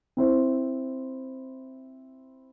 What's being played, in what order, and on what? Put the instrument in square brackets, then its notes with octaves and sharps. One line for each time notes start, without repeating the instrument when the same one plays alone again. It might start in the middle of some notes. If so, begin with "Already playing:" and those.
[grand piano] C4 E4 C5